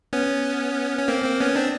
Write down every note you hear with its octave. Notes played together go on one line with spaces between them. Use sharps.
B3 C#4
C#4
A#3 C4
A#3 C4
B3 C#4
C4 D4